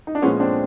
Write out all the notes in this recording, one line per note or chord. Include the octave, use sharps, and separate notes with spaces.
D#4
D4
A#2 F3 G#3 B3 C#4
C4 D4